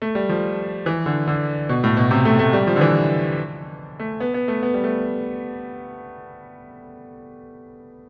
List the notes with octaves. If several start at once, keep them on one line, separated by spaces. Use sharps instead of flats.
A3
G3
F3
E3
D3
D3
B2
A2
B2
C3
A3
A3
G3
F3
D3
E3
A3
B3
B3
A3
B3
G3
A3